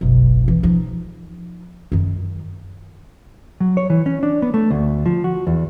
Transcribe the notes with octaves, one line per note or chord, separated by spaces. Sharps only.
F#1 B1
E3
F3 D#4
F#2 D#3
F#3
C#5
E3
C#4
D4
B3
A3
D2
F3
F#4
E2